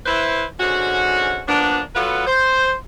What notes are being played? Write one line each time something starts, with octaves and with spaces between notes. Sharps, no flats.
E4 B4 C5
G#2 D3 C#4 F#4
F3 A#3 B3 D4
F#3 B3 F4 F#4 A4 B4
C5